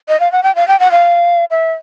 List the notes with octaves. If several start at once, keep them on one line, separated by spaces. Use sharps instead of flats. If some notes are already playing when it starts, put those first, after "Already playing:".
D#5
F5
F#5
G5
F5
G5
F#5
F5
E5